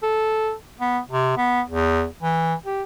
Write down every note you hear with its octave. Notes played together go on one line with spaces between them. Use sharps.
A4
B3
C3
B3
E2
E3
G4